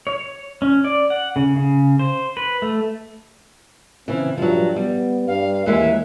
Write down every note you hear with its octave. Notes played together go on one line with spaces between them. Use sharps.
C#5
C#4
D5
F#5
C#3
C#3
C5
B4
A3
C#3 E3 C4
G2 F3 F#3
G3 B3
G2 F5
D#2 E3 G#3 A#3 E5